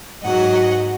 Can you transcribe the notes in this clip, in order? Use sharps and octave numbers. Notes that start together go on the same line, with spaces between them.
G#2 F#3 D#5 F#5